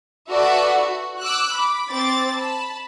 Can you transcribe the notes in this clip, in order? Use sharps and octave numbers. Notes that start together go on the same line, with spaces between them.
F#4 A4 B4 D5 E5 F#5
F#4
D6 E6 F#6
B5 D6
C4 D6 A6
A5 B5